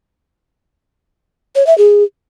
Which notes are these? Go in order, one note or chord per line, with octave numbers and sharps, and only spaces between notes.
C#5
E5
G#4